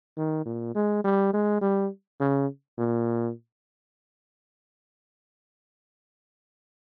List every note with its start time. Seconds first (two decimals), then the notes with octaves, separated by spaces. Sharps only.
0.17 D#3
0.46 A#2
0.75 G#3
1.04 G3
1.33 G#3
1.62 G3
2.20 C#3
2.78 A#2